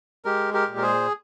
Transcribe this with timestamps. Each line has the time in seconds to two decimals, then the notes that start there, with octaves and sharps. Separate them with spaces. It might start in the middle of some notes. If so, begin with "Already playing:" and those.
0.25 G#3 G4 A#4
0.54 G4 A#4
0.68 A#2
0.77 A#4
0.82 G#4 C5